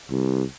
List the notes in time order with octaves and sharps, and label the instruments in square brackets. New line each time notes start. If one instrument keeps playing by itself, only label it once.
[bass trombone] C2